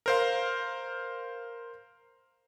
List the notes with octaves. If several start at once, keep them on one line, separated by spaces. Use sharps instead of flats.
A#4 C5 F5